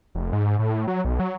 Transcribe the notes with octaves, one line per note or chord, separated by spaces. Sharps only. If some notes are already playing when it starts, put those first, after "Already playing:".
F1
G#2
A2
F#3
B1
F#3